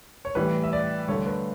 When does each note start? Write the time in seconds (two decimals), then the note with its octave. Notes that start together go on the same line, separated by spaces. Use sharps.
0.25 C#5
0.35 A2 E3 G3 B4
0.63 E5
0.73 D5
1.08 G2 D3 A3 C#5
1.26 B4